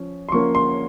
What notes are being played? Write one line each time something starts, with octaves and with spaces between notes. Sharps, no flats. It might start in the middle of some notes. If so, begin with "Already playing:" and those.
Already playing: F3 C#4
C6
F3 A#3 C#4 C#6
C6